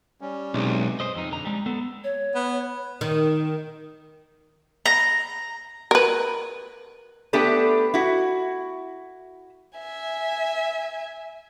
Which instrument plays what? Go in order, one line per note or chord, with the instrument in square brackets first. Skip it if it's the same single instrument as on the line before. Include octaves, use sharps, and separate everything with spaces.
[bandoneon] G3 C#4
[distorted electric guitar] B1 [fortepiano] C3 [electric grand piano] G#3 D#4
[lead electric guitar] C5 D#5
F2 D#4
D3 A#5
G3 G#3
B3 A4
[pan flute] C#5
[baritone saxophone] B3
[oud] D#3
[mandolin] A#5
[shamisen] A#4 B4
[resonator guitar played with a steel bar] A3 B3 D4 G4 A4 B4
E4 F#4
[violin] E5 G#5